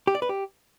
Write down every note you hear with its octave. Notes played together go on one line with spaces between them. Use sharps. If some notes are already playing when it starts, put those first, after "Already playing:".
G4
D5
B4
G4